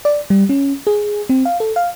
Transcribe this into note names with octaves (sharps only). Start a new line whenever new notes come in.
D5
G3
C#4
G#4
C4
F5
A4
F5